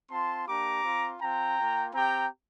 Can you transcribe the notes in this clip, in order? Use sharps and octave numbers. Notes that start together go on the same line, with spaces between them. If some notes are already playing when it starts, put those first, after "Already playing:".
C4 F4 A5 C6
A#3 D4 G4 A#5 D6
C4 F4
C4 F4 G5 A#5
A#3 F4
C4 G4 G5 A#5